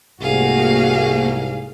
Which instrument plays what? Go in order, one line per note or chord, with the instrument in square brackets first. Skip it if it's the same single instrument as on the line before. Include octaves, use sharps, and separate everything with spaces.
[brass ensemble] C2 G#2 [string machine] A3 A#3 [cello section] F#4 [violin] G#4 F5